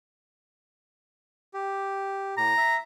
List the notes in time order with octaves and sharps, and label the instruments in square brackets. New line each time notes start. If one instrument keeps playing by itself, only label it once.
[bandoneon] G4
[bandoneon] A2 [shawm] A#5
[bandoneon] E5